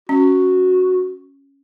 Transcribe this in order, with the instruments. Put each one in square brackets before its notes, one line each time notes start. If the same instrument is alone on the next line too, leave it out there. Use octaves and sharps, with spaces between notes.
[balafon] C#4 [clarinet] F#4